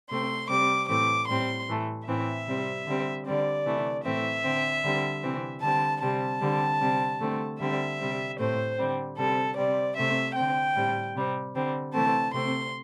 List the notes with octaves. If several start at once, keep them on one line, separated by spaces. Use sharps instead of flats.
C3 A3 C4 C6
C3 G3 C4 D6
A2 E3 A3 C4 D6
A2 G3 C4 C6
A2 E3 A3
A2 E3 C4 E5
C3 G3 C4
D3 G3 C4
D3 G3 C4 D5
C3 E3 A3
A2 E3 A3 C4 E5
D3 C4
D3 G3 C4
C3 E3 C4
D3 G3 C4 A5
C3 G3 C4 A5
D3 G3 C4
C3 G3 C4
D3 A3 C4
D3 G3 C4 E5
C3 G3 C4
A2 A3 C4 C5
D3 G3 C4
C3 G3 C4 A4
C3 G3 C4 D5
C3 A3 C4 E5
D3 C4 G5
A2 G3 C4
C3 G3 C4
D3 G3 C4
C3 E3 A3 C4 A5
C3 A3 C4 C6